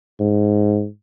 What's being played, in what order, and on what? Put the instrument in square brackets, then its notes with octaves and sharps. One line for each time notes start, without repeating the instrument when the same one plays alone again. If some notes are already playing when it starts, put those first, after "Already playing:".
[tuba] G#2